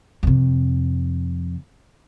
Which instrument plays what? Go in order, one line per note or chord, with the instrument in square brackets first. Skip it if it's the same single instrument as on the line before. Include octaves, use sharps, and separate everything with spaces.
[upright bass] F2 C3